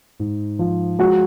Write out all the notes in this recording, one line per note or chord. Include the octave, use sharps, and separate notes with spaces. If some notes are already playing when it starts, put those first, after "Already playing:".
G#2
F3
G#3 F#4